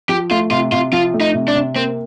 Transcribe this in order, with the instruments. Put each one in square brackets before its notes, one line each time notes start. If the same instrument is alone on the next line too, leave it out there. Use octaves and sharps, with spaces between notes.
[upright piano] F3 [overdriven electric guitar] G4
[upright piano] A3 [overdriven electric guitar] F4
[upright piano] C3 [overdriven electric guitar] F4
[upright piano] C3 [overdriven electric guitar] F4
[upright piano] F3 [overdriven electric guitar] F4
[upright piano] A3
[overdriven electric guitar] D#4
[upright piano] C3
[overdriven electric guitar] D4
[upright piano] C3
[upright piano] A#3 [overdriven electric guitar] C4